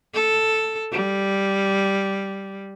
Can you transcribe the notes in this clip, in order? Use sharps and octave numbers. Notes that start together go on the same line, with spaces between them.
A4
G3